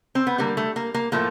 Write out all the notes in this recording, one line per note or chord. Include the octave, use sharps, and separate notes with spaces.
C4
B3
D3 G3 A#3
A3
A#3
A#3
A2 F3 A3 A#3